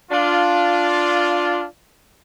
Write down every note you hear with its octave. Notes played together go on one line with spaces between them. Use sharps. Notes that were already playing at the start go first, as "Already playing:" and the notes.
D4 F4